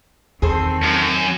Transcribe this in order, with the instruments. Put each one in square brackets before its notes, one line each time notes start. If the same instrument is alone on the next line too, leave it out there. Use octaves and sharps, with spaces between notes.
[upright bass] E2 [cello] D#3 C4 [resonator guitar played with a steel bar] G#4 A4 C5
[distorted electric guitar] F#2